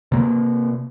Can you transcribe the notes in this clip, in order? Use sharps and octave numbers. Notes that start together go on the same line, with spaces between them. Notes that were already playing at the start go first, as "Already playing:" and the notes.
C3 A#3